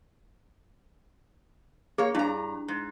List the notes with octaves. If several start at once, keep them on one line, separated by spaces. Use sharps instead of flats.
A#3 G#4 C#5
G2 D4 E4 A#5
G#2